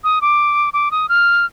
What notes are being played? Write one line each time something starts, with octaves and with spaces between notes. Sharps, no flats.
D#6
D6
D6
D#6
F6